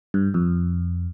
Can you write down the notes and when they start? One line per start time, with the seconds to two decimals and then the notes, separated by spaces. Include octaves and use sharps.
0.14 G2
0.34 F2